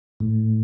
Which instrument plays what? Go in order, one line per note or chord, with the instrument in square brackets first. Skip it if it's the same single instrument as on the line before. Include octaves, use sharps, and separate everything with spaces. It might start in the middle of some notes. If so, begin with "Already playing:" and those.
[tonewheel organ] A2